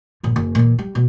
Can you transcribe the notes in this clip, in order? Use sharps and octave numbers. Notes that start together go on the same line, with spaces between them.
A#1 G2
F#1
A#2 E3
G3
B2